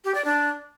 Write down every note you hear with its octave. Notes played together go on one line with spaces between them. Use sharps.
G4
D5
D4